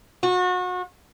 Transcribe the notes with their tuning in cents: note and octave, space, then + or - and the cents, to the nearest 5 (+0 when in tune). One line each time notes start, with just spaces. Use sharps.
F#4 -30